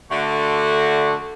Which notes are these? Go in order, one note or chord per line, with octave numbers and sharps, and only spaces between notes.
D3 A3 F#4